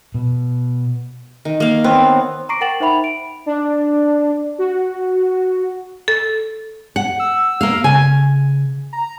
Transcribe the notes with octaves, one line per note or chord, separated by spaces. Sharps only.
B2
D#3
A#3 F5
B3 C4 C#5
A#5 C#6 D6 A#6 C7 D7
A#4 F#5 G5 A6 E7 F#7
D#4 C5 E5 G5 B5 F7
D7
D4
F#4
A4
F#5
E6
A#3 F5
C#3 G#5
A#5